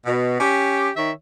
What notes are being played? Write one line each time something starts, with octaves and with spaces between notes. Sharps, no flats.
B2
C#4 G4
D#3 C#5 E5